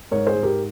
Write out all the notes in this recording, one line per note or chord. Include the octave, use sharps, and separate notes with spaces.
G#2 A#4 C#5
G#4 C5
G#2
G4 A#4